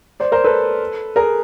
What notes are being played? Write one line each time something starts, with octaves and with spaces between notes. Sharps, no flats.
C5 D5
A#4 C5
A4 B4
G#4 A#4